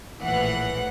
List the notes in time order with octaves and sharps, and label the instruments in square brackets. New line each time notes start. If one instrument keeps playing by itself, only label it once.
[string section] A#1 A2 E3 F#5